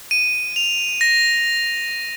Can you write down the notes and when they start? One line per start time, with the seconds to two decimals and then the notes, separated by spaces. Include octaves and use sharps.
0.11 D#7
0.56 F7
1.01 A#6